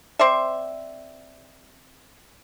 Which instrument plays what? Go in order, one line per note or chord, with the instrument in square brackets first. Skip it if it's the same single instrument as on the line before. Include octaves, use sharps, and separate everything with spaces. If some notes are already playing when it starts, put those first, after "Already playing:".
[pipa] C4 C5 D5 E5